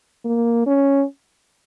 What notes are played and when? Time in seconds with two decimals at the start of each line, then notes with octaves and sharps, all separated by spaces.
0.25 A#3
0.67 C#4